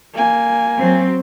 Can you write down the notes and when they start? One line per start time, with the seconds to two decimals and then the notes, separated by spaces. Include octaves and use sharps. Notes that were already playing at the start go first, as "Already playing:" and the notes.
0.14 A#3 G#5
0.77 F#3 C4